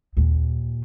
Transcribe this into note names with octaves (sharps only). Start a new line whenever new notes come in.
D#2 A#2